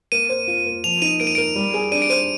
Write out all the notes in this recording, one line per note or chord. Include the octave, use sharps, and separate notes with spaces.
A#3 D#7
C5
F4
A#3
F3 F7
D#4 D#7
A#3 D7
D#7
A#4 D7
G3
G#4
D4 D#7
D7
C5 D#7